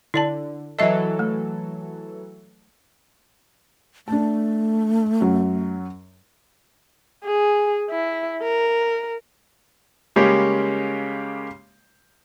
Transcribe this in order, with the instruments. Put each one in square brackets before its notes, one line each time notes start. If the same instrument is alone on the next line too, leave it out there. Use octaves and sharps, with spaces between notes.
[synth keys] D3 [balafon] E4 D5 A5
[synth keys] E3 F#3 A4 [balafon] D#5 E5
[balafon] A3
[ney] A3 [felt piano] D4 A5
[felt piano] F#2 F#3
[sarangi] G#4
E4
A#4
[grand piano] C#3 G3 G#3 A#3 C#4 G4